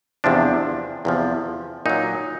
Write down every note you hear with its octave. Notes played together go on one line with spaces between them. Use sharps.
E2 C3 F3 D4
E2 C3 F3
A#2 F#3 D#4